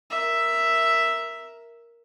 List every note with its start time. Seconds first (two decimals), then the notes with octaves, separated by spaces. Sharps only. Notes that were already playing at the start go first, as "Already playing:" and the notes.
0.11 A#4 E5